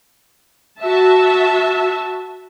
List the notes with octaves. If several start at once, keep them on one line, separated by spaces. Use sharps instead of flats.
F#4 E5 A5